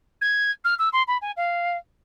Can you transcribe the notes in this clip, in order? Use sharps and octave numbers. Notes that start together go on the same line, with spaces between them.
G#6
F6
E6
C6
B5
G#5
F5